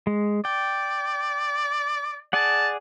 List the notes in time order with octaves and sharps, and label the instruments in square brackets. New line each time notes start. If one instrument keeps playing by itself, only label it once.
[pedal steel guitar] G#3
[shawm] D5 [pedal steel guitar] G5
[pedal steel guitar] G#4 D5 F#5 [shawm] A5